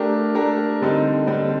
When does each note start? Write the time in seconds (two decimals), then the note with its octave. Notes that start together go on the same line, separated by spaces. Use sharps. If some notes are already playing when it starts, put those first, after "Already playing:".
Already playing: A3 D4 G4 A#4
0.35 A3 D4 G4 A#4
0.82 D3 G3 C4 D#4
1.27 D3 G3 C4 D#4